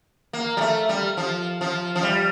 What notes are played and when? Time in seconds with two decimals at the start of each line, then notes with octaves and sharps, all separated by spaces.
0.33 A#3
0.57 G3
0.61 A3
0.89 G3
1.17 F3
1.61 F3
1.96 F3
2.03 G3